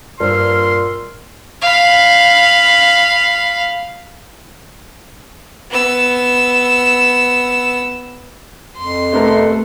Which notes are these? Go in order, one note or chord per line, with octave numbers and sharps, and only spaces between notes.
G2 A#2 C5 C6 E6 F6
F5 B5
B3 E6
F2 C6
C3 A3 B3 A#4